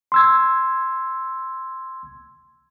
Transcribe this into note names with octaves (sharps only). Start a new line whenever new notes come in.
C6 E6 G#6